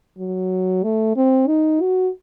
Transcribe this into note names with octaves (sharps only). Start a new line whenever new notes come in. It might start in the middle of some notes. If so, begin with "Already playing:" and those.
F#3
A3
C4
D#4
F#4